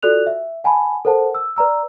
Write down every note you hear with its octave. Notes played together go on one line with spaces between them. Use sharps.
F4 F#4 A4 D5 F#6 F7
E5
F#5 G#5 A5 B5
A4 A#4 C5 F#5 A5
E6
B4 D5 A#5 E6